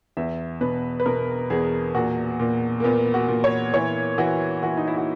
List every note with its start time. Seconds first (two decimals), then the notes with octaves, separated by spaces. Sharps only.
0.17 E2 E5
0.61 B2 B4
1.00 B4
1.06 B2 A#4
1.50 E2 G#4
1.95 A#2 F#4
2.40 A#2
2.80 A#3
2.84 A#2 B3
3.14 F#4
3.28 A#2
3.44 C#5
3.73 E3 C#5
4.18 E3 F#4
4.63 E3 F#4
4.77 D#4
4.87 E4
4.97 F#4